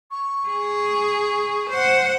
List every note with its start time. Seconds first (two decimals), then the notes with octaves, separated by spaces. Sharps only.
0.10 C#6
0.48 G#4
1.70 C5 F#5